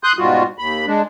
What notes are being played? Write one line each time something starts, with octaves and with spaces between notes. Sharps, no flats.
C6 D#6 F#6 G6
G#2 B2 G3 F4 F#4
D#2 B5
G#3 D4